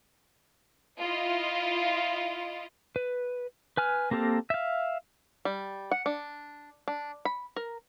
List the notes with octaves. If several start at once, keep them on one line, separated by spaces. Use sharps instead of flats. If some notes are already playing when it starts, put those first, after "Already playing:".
E4 F4 D#5
B4
B4 G#5 F6
A#3 C4 G4 A4 A#4
E5 F5
G3
F#5
D4
D4
B5
A#4